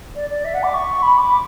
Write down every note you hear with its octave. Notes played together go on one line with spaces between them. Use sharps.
D5
D5
E5
F#5
D6
C#6
B5
D6